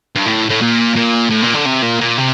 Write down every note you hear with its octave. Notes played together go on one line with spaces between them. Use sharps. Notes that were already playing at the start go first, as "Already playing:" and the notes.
G2
A2
A2
A#2
A#2
A2
A#2
D3
C3
A#2
A#2
C3